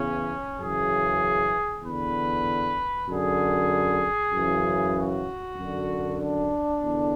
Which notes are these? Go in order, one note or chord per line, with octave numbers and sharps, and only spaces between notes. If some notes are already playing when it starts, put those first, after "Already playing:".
Already playing: E2 C#3 E3 C#4
F#2 C#3 E3 G#4
E2 D3 B4
F#2 D3 G#4
F#2 C#3 E3
F#4
F#2 D3
D4
E2 D3